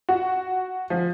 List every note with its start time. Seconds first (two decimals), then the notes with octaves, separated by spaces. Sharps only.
0.09 F#4
0.90 F3